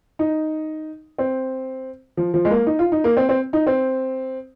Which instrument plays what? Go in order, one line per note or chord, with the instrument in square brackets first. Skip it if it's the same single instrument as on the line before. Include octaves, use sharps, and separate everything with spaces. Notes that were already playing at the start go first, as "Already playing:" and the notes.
[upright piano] D#4
C4
F3
F3
G#3
A#3
D#4
F4
D#4
A#3
C4
C4
D#4
C4